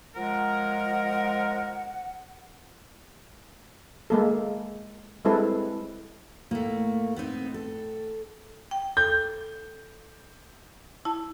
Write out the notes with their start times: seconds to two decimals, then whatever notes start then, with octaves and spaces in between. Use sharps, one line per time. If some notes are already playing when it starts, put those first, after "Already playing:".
0.16 F3 G#3 A#4 F#5
4.10 G#3 A#3 A4
5.25 G3 G#3 C4 E4 A4 B4
6.51 A2 A3 A#3
7.16 B3 C4 D#4
7.54 A4
8.71 G5
8.97 A4 G6
11.05 E4 A5